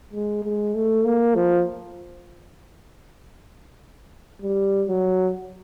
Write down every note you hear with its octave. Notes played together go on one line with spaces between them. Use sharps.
G#3
G#3
A3
A#3
F3
G3
F#3